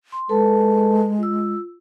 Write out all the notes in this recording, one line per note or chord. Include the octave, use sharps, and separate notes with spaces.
C6
G#3 A4 B4 A5
F4 E6